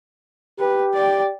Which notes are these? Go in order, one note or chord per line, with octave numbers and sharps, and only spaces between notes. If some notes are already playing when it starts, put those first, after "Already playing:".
G4 B4
D5 G5